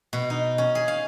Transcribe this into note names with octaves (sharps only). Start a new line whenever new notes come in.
B2
D#4
C#4
G#4
F5